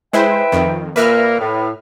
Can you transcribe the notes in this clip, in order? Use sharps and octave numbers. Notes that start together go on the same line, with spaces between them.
G#3 E4 B4 C5 E5 G5
F2 D#3
A#2 A#3 A#4 B4 E5 F6
A2